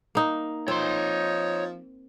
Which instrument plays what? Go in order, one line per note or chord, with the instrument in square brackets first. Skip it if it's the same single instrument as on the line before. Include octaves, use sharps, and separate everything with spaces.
[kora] A#3 D#4
[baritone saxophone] F3 [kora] C4 [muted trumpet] D#4 [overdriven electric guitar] C#5 C6